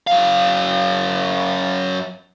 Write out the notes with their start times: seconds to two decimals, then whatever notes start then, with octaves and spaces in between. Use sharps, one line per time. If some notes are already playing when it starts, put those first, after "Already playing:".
0.07 F#2 F5